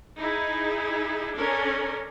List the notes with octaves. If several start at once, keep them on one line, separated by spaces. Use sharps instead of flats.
D#4 E4 G#4
C#4 D4 A4 A#4